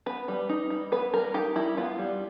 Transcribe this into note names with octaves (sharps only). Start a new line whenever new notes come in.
B3 B4
G3
D#4
G3
B3 B4
G3 A#4
D#4 G4
G3 E4
B3 F4
G3